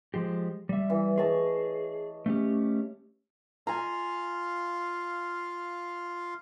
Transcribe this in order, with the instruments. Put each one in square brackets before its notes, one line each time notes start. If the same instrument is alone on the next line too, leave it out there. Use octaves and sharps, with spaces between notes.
[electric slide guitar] F3 G#3 G4
G3 E5
[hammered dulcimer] E3
[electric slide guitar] G#4 [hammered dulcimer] C#5 D#5 A5
[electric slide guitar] A3 C#4 G4
[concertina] F4 F5 [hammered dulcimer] G#5 A#5